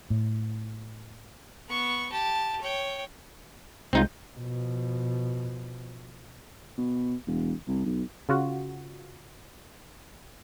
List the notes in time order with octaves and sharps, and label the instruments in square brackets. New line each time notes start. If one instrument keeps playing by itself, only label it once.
[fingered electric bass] A2
[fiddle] B3 C#6
G4 A5
C#5 G5
[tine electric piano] C2 G#3 G6 [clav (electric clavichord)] C4 D#4 F4
[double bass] B2 F3
[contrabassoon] B2
E1
C2
B1
[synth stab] C#3 F4 F#4